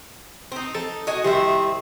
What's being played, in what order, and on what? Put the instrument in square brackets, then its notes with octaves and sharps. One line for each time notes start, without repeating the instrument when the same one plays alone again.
[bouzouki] C4 D#4
[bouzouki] D#4 [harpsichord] A4
[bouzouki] F#4 D#5 G#5
[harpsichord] C2 C3 [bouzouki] D#3 C5 E5